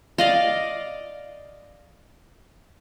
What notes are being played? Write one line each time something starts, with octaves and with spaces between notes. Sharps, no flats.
D5 D#5 F5